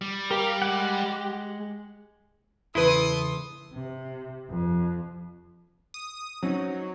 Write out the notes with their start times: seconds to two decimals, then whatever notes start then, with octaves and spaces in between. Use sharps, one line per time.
0.01 G3
0.31 G4 A#4 F5
0.62 G#3 F#5
2.75 E2 C#3 E3 E4 A4 B4 C6 D#6
3.74 C3
4.50 F2
5.94 D#6
6.43 F#3 C4 C#4 D#4